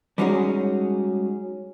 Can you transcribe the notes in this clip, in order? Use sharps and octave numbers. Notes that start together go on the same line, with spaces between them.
G3 G#3 C#4 D#4 F#4 G#4